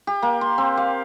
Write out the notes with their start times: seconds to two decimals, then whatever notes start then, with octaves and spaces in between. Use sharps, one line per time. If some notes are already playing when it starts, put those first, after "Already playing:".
0.07 G4
0.22 A#3
0.41 C6
0.58 C4
0.77 F5